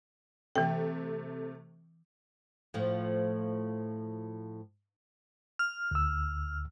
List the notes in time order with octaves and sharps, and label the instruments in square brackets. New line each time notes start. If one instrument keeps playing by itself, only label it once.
[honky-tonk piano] C3 A3 [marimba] E3 G5
[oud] A2 F3
[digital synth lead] F6
[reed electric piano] D2 E6